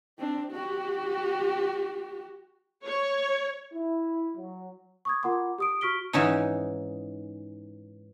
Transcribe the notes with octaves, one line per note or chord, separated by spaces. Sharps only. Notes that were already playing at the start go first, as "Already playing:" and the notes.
C4 D4
F#4 G4
C#5
E4
F#3
C#6 D#6 G#6
F4 A#4 F#5 A#5 C6 D6
G4 D#6 D7
F#4 C#6 F6 B6 D7 G7
G#2 E3 C#4 D#4